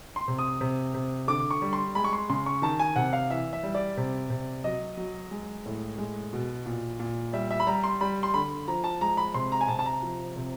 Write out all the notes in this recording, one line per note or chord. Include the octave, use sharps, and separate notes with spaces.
C6
C3
D#6
C3
C3
D3 D6
C#6
G3
C6
G#3 B5
C#6
C6
C#3 C6
C#6
D#3 A5
G#5
C3 F#5
F5
E3 E5
E5
G3
D5
C3
C3
F#3 D#5
F#3
G#3
A2
G#3
B2
A#2
A#2
G3 E5
E5
B5
G3 A#5
C6
G3 B5
C6
D3 B5
F3 A#5
A5
G#3 A#5
B5
C3 C6
A#5
G#5
C3 A5
A5
A#5
F3
C3